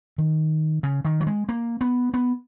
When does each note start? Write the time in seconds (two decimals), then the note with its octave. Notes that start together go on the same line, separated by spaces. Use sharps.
0.18 D#3
0.83 C#3
1.05 D#3
1.21 F#3
1.27 G#3
1.49 A#3
1.81 B3
2.14 B3